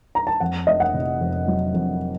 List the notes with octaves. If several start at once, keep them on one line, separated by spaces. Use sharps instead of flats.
A#5
A5
F2 F#5
F1 D#5
F#5
C3
F2
F#3
F2